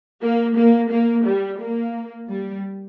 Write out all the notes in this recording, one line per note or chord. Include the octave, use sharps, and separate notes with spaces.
A#3
A#3
A#3
G3
A#3
G3